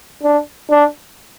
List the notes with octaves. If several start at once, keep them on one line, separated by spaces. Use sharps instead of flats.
D4
D4